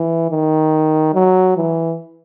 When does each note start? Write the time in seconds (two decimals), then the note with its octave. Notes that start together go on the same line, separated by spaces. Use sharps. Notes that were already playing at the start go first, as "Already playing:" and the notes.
Already playing: E3
0.31 D#3
1.14 F#3
1.57 E3